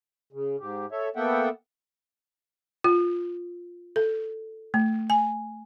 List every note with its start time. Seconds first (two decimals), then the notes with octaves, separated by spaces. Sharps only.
0.33 C#3
0.60 G#2 G4
0.92 A4 C#5 E5
1.16 A#3 B3 A4 E5 F#5 G5
2.84 F4
3.96 A4
4.74 A3
5.10 G#5